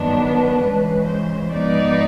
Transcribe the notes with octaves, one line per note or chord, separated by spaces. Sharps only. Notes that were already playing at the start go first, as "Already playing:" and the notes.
Already playing: G2 D#3 F#3 B3 D4
B4
C#3 E3 G#3
C5
G#2 F3 G#3 B3 D#4 D5